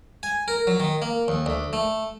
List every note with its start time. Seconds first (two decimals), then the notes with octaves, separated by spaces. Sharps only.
0.23 G#5
0.48 A#4
0.67 F#3
0.80 D#3
1.02 A#3
1.28 D#2
1.46 D2
1.73 A3